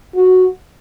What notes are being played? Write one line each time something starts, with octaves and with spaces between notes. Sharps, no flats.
F#4